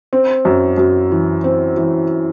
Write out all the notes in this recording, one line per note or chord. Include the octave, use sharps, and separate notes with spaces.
C4
F#2
F#2
E3
C4
E3